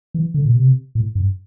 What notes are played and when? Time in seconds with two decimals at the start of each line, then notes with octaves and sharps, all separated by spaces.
0.14 E3
0.34 D3
0.45 A#2
0.55 C3
0.95 A2
1.15 G2